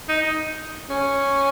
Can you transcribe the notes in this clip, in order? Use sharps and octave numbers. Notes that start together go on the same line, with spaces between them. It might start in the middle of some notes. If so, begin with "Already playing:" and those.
D#4
C#4